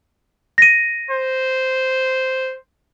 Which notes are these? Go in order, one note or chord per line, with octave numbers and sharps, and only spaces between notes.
A#6 D#7
C5